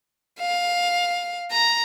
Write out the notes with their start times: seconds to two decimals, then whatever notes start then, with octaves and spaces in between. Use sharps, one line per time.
0.40 F5
1.51 A#5